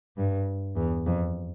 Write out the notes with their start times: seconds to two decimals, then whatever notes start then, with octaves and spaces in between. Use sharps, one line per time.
0.17 G2
0.76 E2
1.06 F2